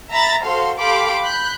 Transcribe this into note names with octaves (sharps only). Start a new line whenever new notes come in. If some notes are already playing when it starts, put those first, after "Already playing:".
E5 A#5 B5 A6
F#4 A4 C5 F5 C6
G4 A4 F5 B5 C6 D6
B5 F#6 G6